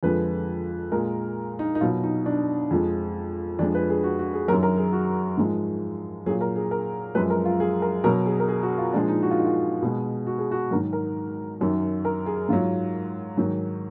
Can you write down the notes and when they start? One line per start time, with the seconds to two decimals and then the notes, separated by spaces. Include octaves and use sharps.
0.03 F2 D3 F3 G#3 B4
0.92 A#2 G#3 A#4
1.59 D#4
1.75 D#4
1.81 B2 F#3 F4
2.03 D#4
2.26 D4
2.71 F2 F3 G#3
3.59 F2 F3 G#3 D4
3.75 B4
3.89 G#4
4.04 F#4
4.19 F#4
4.33 G#4
4.48 F#3 A#4
4.51 F#2 D#3
4.63 A#4
4.78 G#4
4.93 F#4
5.37 G#2 F3 G#3
6.26 A#2 F#3 G#4
6.41 A#4
6.56 G#4
6.71 A#4
7.15 F#2 F3 G#3 B4
7.30 A#4
7.45 F4
7.60 G#4
7.82 A#4
8.04 B2 F#3 A#4
8.26 G#4
8.40 A#4
8.49 G#4
8.63 F#4
8.78 F4
8.93 A#2 F3 G#3 D4
9.08 D#4
9.22 F#4
9.31 F4
9.39 D#4
9.46 F4
9.82 B2 G#3
10.27 F#4
10.38 G#4
10.51 F#4
10.71 G#2 D#3 F#3 A#4
10.93 A#4
11.61 F#2 D#3 F#3
12.05 A#4
12.26 G#4
12.49 G#2 F#3 F4
13.38 G#2 D#3 F#3